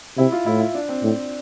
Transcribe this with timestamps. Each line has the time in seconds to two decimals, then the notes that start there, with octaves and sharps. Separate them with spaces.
0.18 C3 E4
0.32 F4
0.46 A2 E4
0.60 E4
0.74 D4
0.89 C4
1.03 A2